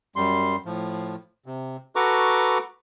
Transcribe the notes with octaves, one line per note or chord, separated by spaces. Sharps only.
F#2 G3 C6
A2 F3
C3
F#4 A4 B4 A#5 C#6 D6